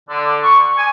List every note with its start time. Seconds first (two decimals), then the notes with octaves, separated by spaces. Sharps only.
0.10 D3
0.43 C#6
0.77 G#5